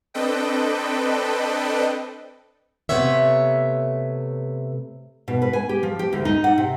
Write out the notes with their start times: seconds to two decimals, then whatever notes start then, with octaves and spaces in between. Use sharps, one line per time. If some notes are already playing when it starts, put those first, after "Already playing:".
0.14 C4 D4 A4 B4 D#5 G5
2.89 C3 F3 A3 B3 C#5 E5
5.28 B2
5.42 B4
5.53 G#5
5.69 G4
5.83 F3
5.99 G4
6.13 D2
6.25 D#4
6.44 F#5
6.58 C3